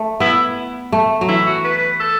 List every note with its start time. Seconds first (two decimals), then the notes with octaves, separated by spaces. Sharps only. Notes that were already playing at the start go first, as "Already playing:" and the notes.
Already playing: A3
0.20 B3 E4
0.92 A3
1.21 F#3
1.28 E3 E4
1.46 F#4
1.64 B4
2.00 A4